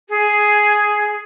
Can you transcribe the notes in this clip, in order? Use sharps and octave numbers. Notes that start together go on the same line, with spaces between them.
G#4